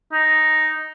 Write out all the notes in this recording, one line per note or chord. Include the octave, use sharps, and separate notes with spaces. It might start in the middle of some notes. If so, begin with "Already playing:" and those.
D#4